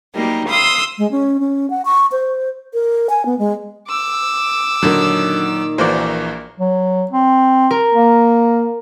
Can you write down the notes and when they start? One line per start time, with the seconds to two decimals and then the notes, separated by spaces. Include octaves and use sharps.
0.13 F#3 G3 A#3 D#4
0.49 F5 C6 D#6 E6
0.98 G#3
1.11 C#4
1.40 C#4
1.70 F#5
1.85 C#6
2.12 C5
2.74 A#4
3.09 G#5
3.26 B3
3.39 G#3
3.88 D6 E6
4.83 A#2 D3 D#3 F#3
5.78 A#1 E3 A#3 F#4 A#4 C5 D5
6.58 F#3
7.11 C4
7.71 A#4
7.94 A#3